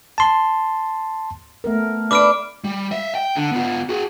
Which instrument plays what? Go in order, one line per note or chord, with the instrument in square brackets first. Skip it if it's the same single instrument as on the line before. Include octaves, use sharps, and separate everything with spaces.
[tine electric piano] A5 C6
[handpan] A3 B3 A#4
[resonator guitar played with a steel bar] D4 B4 [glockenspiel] D6 F6 D7
[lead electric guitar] G3
D#5 E5
G5
D3
B3 F4
F#4 G#4